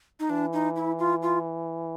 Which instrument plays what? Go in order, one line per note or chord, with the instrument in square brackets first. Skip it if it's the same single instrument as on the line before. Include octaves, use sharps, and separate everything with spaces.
[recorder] D#4
[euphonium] E3 [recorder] D4
[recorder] D#4
E4
F4
F4